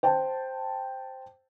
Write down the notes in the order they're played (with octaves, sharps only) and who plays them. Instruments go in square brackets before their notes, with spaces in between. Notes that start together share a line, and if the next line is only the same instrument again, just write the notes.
[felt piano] C5 G5 A5